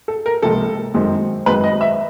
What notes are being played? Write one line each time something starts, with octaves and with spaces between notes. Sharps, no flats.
A4
A#4
C#2 C3 F3 A#3 A4
F#2 D#3 G#3 C4
F#2 D#3 G#3 C4 B4
D#5
E5